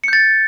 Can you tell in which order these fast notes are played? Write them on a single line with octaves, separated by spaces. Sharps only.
C#7 G6 A6